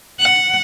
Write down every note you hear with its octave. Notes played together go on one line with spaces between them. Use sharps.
F#5